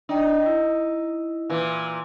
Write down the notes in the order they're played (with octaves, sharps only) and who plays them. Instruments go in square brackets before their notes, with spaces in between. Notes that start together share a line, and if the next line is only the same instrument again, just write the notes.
[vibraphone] D4 D5 G5 [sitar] D#4
[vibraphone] E4
[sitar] A#2 E3